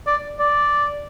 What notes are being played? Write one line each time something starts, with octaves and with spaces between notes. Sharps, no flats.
D5
D5